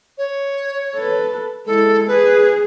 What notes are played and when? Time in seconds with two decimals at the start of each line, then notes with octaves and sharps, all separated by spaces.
0.18 C#5
0.96 A4 B4
1.66 G#3 E4 A4
2.08 G#4 B4